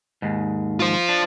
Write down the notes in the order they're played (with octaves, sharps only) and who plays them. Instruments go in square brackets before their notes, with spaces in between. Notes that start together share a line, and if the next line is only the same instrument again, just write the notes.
[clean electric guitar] D#2 G#2
[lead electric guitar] F4 C5
[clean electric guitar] D4